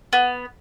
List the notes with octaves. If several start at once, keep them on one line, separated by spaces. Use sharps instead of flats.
B3